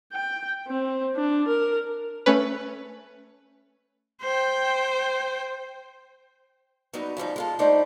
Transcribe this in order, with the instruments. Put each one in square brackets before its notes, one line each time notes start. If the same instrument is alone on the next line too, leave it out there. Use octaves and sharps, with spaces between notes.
[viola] G5
C4
D4
A#4
[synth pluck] A3 C#4 B4
[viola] C5 G5
[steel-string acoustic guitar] F#3 G3 B3 D#4
C#3 F3 G3 D#4
G#3 F4 A4
G3 A3 D4 D#4 C5 D5